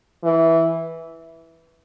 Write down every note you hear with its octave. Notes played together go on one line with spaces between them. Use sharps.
E3